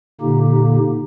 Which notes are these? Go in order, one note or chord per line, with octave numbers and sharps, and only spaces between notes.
A#2 D3 A#3 D#4 G4